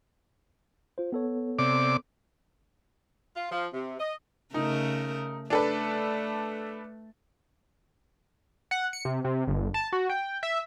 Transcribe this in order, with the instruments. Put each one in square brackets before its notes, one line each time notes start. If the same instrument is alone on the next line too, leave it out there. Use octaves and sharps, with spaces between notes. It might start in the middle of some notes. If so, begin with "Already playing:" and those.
[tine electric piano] F4 C5
B3 A4 C#5
[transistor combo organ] C3 D5 D6
[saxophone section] F4
F3
C3
D#5
[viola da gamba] C#3 A3 A#4 [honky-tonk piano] D#4
[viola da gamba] A3 [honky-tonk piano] D4 A4 B4
[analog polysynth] F#5
C#7
C3
C3
G1
A5
F#4
G5
E5